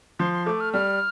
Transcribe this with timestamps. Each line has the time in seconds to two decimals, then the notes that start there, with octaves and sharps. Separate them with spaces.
0.19 F3 C6
0.33 C6
0.46 A3 D6
0.60 F6
0.73 G3 F6